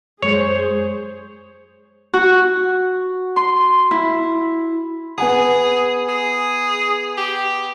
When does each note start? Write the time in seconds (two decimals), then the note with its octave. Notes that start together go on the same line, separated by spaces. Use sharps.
0.22 F#2 G#3 G#4 C5 C#5
2.14 F#4
3.36 C6
3.91 E4
5.18 B3 G#4 F#5 G#5
6.09 G#4
7.17 G4